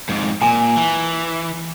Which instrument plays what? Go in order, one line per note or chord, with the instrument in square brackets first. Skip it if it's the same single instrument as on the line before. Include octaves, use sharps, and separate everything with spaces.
[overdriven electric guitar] F2 G#2
[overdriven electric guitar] A#2 [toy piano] G#5
[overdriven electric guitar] E3